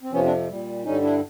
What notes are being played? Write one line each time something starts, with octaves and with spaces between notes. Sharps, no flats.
C4
F2 C3 F3 B3 C#4
C4 D4
A#2 G3
G2 D3 G3 C#4 D#4
D4 E4